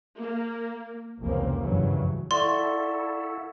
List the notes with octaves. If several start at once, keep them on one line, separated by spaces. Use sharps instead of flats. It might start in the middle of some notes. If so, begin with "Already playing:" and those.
A#3
F1 C#2 C#3 E3 A#3 C4
F#1 G2 A#2 C#3 E3 F#3
E4 A4 D5 F5 F#5 C6 C#6